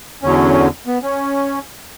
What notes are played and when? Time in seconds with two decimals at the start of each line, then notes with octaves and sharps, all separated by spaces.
0.23 E2 D3 F#3 C#4
0.87 B3
1.03 C#4